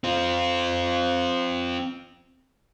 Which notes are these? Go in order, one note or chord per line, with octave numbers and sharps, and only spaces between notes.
C4 F4